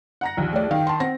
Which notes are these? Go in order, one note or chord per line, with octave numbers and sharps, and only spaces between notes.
F#5 A#5 A#6
A#1 D#2
A3 G#4 D5
D#3 F5 G5
A5 C6
C4 F#5 A#6